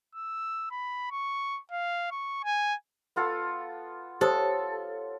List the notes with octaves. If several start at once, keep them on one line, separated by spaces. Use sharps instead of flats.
E6
B5
C#6
F5
C#6
G#5
B3 F4 A4
G4 A4 C5 C#5 D#6